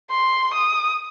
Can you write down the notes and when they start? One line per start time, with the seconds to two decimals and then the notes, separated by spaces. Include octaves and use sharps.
0.11 C6
0.53 D#6